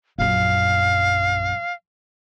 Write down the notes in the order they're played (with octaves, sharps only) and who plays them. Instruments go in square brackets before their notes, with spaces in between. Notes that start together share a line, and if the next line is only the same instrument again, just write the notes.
[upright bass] A#1 F#2 [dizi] F5